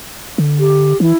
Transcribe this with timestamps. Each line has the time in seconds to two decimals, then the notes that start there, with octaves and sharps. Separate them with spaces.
0.38 D3
0.58 G4
1.00 E3 E4